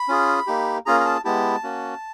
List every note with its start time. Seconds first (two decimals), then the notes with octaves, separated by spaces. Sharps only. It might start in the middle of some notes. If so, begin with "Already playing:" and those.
Already playing: B5
0.08 C#4 F4 G#4
0.47 A#3 D#4 G4
0.86 A#3 C#4 F4 G#4 A#5
1.00 A#5
1.06 A5
1.25 G#3 B3 E4 G4 A5
1.63 A#3 C#4 F#4